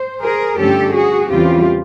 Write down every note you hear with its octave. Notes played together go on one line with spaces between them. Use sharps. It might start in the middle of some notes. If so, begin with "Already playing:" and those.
Already playing: C5
G#4 A#4
G2 D3 F3 A3 C#4 G4 A4
F#4 G#4
E2 C#3 E3 G3 C4 F4 G4